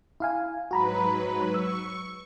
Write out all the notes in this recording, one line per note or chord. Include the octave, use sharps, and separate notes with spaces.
E4 F5 G#5
G#2 F#3 F#4 B4 A#5 B5
C#6 E6